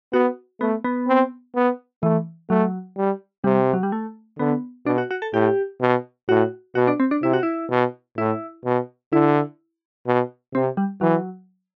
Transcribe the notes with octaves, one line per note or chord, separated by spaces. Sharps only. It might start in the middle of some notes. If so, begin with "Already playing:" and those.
B3 F#4
A3 B3
B3
C4
B3
E3 A3
F#3 A3
G3
C3 G3
F#3
G3
A3
D3 B3
B2 D4
F#4
F#4
A4
A2 G4
B2
A2 F#4
B2 F#4
D4
C4
D4
C3 E4
F#4
E4
B2
A2 E4
B2
D3 E4
B2
C3 C4
G3
E3 F#3